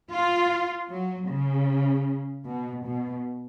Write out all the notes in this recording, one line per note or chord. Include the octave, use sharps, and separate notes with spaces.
F4
F#3
C#3
B2
B2